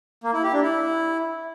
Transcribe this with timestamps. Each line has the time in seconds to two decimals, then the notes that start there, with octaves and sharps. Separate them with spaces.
0.24 A#3
0.33 E4
0.43 G4
0.53 D4
0.63 E4